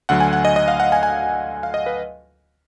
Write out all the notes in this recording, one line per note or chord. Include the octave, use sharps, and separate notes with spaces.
D2 D3 F#3 F#5
G#5
F#5
D#5
D#5
F5
F#5
G#5
G#5
F5
D#5
B4